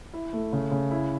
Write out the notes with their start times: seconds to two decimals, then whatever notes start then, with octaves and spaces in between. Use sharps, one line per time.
0.13 E4
0.33 A3
0.53 C#3
0.71 C#3
0.91 E4